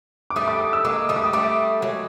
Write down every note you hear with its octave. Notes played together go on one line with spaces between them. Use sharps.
D6
G3 A3 D#6
D6
D#6
E6
G#3 A#3 D6
G3 A3 D#6
D6
D#6
G3 A3 D6
F#3 G#3